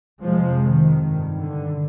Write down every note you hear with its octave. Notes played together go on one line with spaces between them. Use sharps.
F2 C3 F3 G#3
D#3
G2
D3